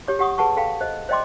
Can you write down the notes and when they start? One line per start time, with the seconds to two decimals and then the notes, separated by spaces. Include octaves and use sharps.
0.08 G4 C#5 D6
0.19 G4 C#5 F#5 C#6 D#6
0.38 G#4 B4 F#5 A5 C#6
0.57 A4 F5 G5 B5
0.81 C5 D#5
1.09 C5 D5 D#5 G5 C6 D6